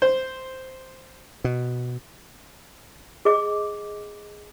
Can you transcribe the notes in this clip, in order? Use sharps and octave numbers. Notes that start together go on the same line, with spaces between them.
C5
B2
G#4 D#5 D6